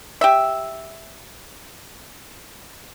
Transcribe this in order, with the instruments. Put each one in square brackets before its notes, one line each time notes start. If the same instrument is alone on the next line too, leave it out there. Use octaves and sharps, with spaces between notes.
[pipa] G4 E5